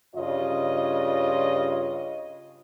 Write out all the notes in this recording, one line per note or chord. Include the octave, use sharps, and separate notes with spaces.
G2 C#3 F4 C#5 D#5